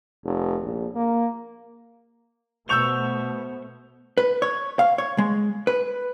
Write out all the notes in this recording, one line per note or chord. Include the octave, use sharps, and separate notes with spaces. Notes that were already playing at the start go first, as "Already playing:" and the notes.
F1
A#1
A#3
B2 A3 B3 C5 C#6 E6 G6 F7
B4
C#5
F5
C#5
G#3
B4